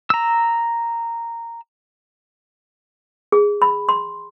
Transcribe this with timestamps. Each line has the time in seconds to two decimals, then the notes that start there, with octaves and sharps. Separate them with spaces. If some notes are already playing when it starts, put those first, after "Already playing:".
0.10 A#5 E6
3.32 G#4
3.62 B5
3.89 C6